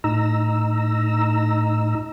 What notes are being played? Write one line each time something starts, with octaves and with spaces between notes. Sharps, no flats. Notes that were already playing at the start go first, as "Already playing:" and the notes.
A2 D#4 A#5 E6